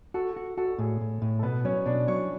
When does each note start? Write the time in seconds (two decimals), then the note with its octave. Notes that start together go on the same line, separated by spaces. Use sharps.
0.14 F#4 A4
0.37 F#4
0.58 F#4 A4
0.78 A2 G#4
1.01 A2
1.22 A2
1.39 A4
1.43 B2 B3 B4
1.64 F#3 C#4 C#5
1.86 B2 D4 D5
2.07 F#3 C#5 C#6